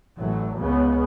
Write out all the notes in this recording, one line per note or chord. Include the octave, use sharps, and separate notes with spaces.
A1 F#3 A3
C#2 C#3 B3